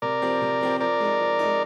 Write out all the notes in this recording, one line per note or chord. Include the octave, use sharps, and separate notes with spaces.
C3 A#4 D5
F3 C4 G4
C3
F3 C4 G4
F3 A#4 D5
G#3 D#4
F3
G#3 D#4